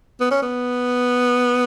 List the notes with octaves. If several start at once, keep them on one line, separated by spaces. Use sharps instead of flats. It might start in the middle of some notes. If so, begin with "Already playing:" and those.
B3
C#4
B3